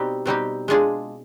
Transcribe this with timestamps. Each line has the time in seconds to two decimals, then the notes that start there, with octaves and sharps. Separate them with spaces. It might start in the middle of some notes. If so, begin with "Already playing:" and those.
Already playing: B2 G3 C4 D#4 G4
0.26 B2 G3 C4 D#4 G4
0.68 G#3 D4 F4 G#4